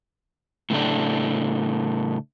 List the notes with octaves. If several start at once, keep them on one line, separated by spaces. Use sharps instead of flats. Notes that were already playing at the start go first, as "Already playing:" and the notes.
A2 C#3 A3 D4